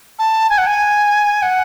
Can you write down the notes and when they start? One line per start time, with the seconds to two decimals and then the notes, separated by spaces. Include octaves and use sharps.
0.19 A5
0.50 G#5
0.58 F#5
0.67 G#5
1.42 F#5